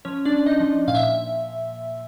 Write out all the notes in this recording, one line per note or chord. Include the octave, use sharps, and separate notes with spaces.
F3 C#4 C#5
D4 D5
F3
D#4 D#5
F3
A#2 F5
E5